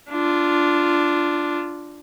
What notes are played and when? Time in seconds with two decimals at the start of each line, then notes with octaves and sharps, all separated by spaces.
0.10 D4 F4